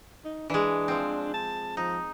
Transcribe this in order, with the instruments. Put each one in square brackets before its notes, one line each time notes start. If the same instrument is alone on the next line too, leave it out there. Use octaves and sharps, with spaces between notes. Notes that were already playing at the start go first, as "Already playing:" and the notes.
[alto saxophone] D#4
[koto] E3 G#3 [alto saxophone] D4
[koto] F3 C4
[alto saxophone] A5
[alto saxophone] F3 [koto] D#4